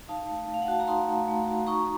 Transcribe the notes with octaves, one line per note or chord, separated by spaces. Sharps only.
D#4 F5 A5
A3
A3 F5
F#5
F#4 A5
A#5
D#4 A5 C6
A3
A3
F#4
D#4 A#5 C#6